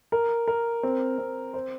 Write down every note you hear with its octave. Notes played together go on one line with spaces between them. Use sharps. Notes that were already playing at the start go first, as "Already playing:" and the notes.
A#4
A#4
C4
C4
C5